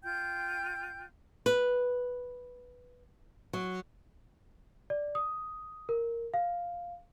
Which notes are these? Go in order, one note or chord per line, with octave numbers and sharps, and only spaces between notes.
F4 G5 G6
B4
F#3
D5
D#6
A#4
F5